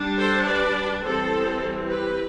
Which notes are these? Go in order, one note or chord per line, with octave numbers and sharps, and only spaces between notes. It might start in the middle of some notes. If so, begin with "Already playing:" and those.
Already playing: G3 D4
A4 C5
B4 D5
E3 G3 C4 A4 C5
G4 B4